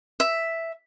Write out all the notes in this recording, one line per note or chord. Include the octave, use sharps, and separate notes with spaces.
E5